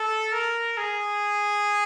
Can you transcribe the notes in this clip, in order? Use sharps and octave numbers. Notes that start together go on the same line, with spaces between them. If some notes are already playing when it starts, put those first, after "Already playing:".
Already playing: A4
A#4
G#4